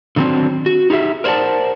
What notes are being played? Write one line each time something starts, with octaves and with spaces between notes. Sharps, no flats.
D3 D#3 F#3 B3 C4 D4
F#4
D#4 G4 G#4 E5
A#4 C5 D5 F5 F#5 A5